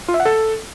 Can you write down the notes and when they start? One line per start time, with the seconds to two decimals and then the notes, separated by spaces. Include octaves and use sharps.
0.08 F4
0.14 E5
0.20 F#5
0.26 A4